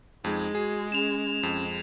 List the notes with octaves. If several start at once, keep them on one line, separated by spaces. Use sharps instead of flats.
F2 G#3 D#4
F#4 G#4
C#4 E7 F7
F2